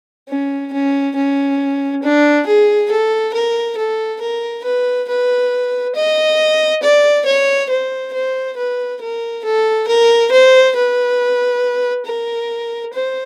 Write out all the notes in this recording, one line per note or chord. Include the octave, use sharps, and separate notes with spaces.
C#4
C#4
C#4
D4
G#4
A4
A#4
A4
A#4
B4
B4
D#5
D5
C#5
C5
C5
B4
A#4
A4
A#4
C5
B4
A#4
C5